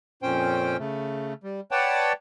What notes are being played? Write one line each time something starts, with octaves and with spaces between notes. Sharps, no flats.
F2 A#2 C#4 C5 G5
C#3 A3
G3
B4 C#5 D5 F#5 G5 A5